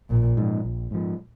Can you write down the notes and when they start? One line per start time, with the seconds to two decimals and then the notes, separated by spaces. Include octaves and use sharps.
0.10 A#1 A#2
0.37 G#2 F3
0.65 A#1
0.91 G#2 F3